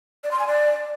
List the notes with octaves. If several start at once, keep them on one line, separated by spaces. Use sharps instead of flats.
D5
C6
G#5
D5